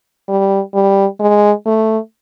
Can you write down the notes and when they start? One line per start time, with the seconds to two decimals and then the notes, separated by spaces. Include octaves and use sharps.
0.29 G3
0.74 G3
1.20 G#3
1.66 A3